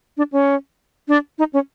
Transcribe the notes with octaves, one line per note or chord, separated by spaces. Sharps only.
D4
C#4
D4
D#4
C#4